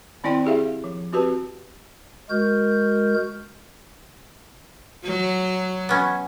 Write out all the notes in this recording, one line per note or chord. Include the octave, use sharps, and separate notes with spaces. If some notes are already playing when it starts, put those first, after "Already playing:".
D#3 C4 E4 D5 G5 C6
E4 G4 G#4 E5 F5
F3
C4 F#4 G4 B4 A5
G#3 F#4 A#4 G6
F#3
B3 C#4